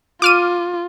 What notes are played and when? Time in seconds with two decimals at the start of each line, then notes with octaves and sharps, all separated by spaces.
0.22 F4 D6 F6 D#7